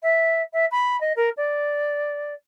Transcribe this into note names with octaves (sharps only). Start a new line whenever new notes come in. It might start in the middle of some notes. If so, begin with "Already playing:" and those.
E5
E5
B5
D#5
A#4
D5